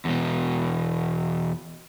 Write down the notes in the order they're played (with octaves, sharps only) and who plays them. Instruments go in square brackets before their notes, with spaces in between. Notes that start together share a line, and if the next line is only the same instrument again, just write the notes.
[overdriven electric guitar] E2 B2